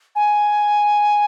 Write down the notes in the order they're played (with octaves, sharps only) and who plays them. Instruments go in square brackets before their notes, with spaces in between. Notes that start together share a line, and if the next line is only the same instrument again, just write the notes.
[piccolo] G#5